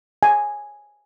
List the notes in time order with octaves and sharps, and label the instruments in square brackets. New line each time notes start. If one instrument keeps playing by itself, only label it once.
[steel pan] G#5